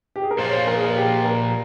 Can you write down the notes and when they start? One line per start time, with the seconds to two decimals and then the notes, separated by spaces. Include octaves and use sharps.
0.16 G4
0.23 G#4
0.31 A#4
0.39 A#2 F3 A#3 F4 C5
0.49 C#5
0.53 C5
0.67 A#4
0.75 G#4
0.84 A#4
0.96 G4
1.25 A#4